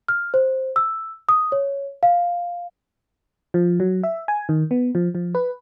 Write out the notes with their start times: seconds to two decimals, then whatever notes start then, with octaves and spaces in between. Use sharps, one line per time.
0.08 F6
0.34 C5
0.76 E6
1.29 D#6
1.52 C#5
2.03 F5
3.54 F3
3.80 F#3
4.03 E5
4.28 G#5
4.49 D#3
4.71 B3
4.95 F3
5.15 F3
5.35 B4